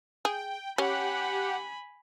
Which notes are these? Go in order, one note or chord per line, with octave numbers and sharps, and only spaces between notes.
G#4 G5
C#4 G4 F#5 G#5 B5